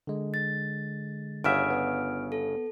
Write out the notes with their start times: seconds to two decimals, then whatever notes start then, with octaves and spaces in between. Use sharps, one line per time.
0.07 D3 G#3
0.34 A6
1.44 G1 C#3 E5 F#5 F6 D7
1.70 B3
2.32 A4